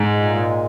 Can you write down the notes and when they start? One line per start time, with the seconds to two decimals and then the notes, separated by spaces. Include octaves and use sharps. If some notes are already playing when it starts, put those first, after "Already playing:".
Already playing: G#2 G#3
0.14 A#2
0.36 G#3